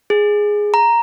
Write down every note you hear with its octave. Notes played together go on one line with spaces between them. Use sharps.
G#4
A#5